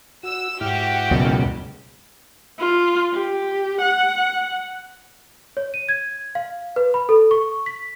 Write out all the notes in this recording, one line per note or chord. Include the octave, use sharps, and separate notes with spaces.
F#4 E6
G#2 E4 F#4 G4 F6
C#2 F#2 B2
F4
G4
F#5
C#5
D#7
G#6
F5
B4
B5
A4
C#6
B6